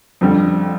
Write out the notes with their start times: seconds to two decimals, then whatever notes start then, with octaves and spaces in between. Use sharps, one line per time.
0.21 F2 D3 G3